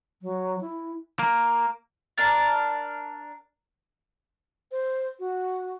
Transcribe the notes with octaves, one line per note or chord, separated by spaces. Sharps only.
F#3
E4
A#3
D4 A#4 A5
C5
F#4